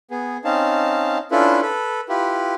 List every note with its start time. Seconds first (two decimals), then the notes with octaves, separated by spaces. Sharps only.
0.11 B3 G#4
0.45 C4 C#4 D#4 F5 A5
1.31 C#4 D4 E4 F4 A4 B4
1.62 A4 B4
2.09 E4 F4 G4 B4